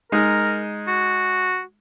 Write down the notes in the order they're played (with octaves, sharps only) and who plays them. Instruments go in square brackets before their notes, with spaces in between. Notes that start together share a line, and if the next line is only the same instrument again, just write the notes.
[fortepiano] G#3 D#4 [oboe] A#4
[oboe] F#4